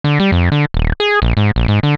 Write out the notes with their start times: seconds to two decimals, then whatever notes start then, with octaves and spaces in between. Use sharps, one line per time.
0.04 D3
0.20 G3
0.32 F2
0.52 D3
0.74 D#1
1.00 G#4
1.22 A#1
1.37 G#2
1.56 A#1
1.68 G#2
1.83 D3